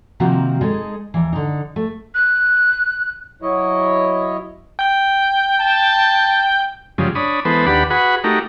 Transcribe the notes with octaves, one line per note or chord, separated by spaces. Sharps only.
C3 D#3 F3 A#3 C4 F#4
G#3 D#4 G#4 A4
D#2 E3
D3 D#4
A3
F#6
F#3 E4 C#5 D#5
G5 G6
A5
F#2 C#3 F3 G3 G#3
D4 C#5 B5 D#6
E3 G#3 B3 A4 B4 C5
D#2 D4 G4 B4 F#5 B5
F#4 G#4 B4 F#5 B5
A3 D#4 F#4 G4 A#4